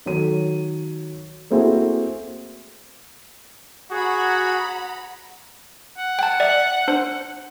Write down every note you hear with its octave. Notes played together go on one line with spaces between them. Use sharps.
D#3 F#3 A4 C#5 D#7
A3 A#3 C4 E4 F#4 G#4
F#4 G#4 F#5 A#5 B5
F#5
G5 A5
D5 E5
D4 C5